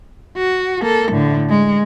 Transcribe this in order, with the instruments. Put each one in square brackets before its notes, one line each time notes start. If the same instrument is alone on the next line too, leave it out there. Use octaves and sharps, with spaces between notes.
[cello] F#4
A#3 A4
A2 D3
G#3